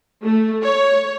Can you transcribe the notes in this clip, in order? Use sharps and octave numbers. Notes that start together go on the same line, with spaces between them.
A3
C#5